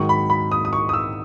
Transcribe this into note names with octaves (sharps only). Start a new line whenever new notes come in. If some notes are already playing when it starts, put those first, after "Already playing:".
Already playing: G#2 D#3 F#3 C#6
B5
B5
D#6
D#6
C#6
D#6
E6